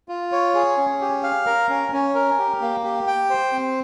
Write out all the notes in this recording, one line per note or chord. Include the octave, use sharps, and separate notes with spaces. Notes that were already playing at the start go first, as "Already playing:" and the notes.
F4
C#5
G#4
C#4
G4
F5
A#4
C#4
C#4
A#4
G4
A#3
G4
G5
C5
C4